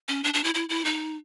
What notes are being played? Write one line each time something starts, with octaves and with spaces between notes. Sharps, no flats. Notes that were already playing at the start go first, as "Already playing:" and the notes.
C#4
D4
D4
E4
E4
E4
D#4